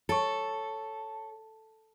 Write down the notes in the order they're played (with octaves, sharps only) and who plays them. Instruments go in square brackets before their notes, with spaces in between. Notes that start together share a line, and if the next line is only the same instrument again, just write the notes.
[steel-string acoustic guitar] A4 [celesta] C#5 A5 C#6